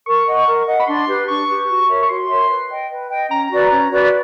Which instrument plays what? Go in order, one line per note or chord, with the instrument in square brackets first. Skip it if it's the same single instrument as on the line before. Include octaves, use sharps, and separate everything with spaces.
[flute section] A#4 [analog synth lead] C#6
[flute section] D#5 F#5
A#4
D#5 F#5
[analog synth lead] B5
[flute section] D4 [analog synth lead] C6
[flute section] G4 B4
[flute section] D4 [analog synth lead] C#6
[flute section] G4 B4
F#4
A#4 C#5 E5
[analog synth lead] C#6
[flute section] F#4 [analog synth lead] C6
[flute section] A#4 C#5 E5
B4
D#5 G5
B4
D#5 G5
[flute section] C#4 [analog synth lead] A#5
[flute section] F#4 B4 D5
C#4
F#4 B4 D5